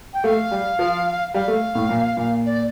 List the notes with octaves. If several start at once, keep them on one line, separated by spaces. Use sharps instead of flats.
G5
A3 F5
G3
F3
G3 F5
A3
A2
A#2
A#2
D5